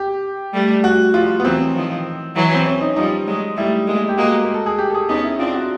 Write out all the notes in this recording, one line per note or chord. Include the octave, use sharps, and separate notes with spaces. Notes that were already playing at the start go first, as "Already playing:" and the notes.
Already playing: G4
G3 A3
F#4
F3 G3 F4
B3
E3 F#3 C4
D#3 F3
E3 F#3
C4
C#4
D#4
F3 G3 D#4
F#3 G#3
G3 A3 E4
G#3 A#3
G4
G#3 A#3 F#4
A#4
A4
G#4
G4
A4
G#4
B3 C#4 D#4
E4
C4 D4 F4
F#4